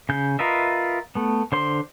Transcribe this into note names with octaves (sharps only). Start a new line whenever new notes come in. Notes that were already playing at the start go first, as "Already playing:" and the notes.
C#3 G6
F4 A#4 B4 D#5 E5
A3 B3
D3 C5 C6